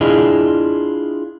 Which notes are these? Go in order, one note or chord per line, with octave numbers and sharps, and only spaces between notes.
D4 E4 F4 G#4 D#5